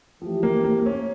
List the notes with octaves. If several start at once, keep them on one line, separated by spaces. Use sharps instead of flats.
E3 F3 A3 E4 G4
A#3
A#3
A#3
C#4